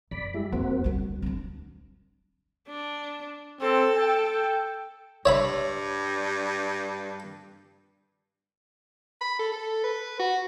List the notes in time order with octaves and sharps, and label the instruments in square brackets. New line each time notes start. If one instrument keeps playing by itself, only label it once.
[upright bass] F#2 [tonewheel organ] D5 B5
[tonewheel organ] G3 G#3 E4
[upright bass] F2 [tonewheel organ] A#3 C4 F#4
[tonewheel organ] D2 [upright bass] G3 B3
[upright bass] C#4 D4
[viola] D4
[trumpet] C4 [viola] A4
[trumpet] G5
[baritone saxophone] G2 [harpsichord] C#5 E5 B5
[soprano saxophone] B5
A4
A4
B4
F#4